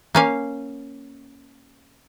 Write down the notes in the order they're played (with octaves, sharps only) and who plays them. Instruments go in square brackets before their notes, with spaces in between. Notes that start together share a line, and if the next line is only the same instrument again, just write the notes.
[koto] A#3 C#4 F5